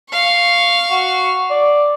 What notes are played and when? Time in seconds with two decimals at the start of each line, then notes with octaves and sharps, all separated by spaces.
0.11 F5 C#6
0.91 F#4
1.50 D5